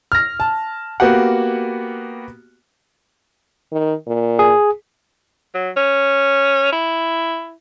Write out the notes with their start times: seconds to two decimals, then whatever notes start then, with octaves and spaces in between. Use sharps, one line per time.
0.12 F6 A#6
0.40 A5
1.00 A#3 B3 F#4 G4 F#5
3.72 D#3
4.07 A#2
4.39 G#4
5.55 F#3
5.77 C#4
6.72 E4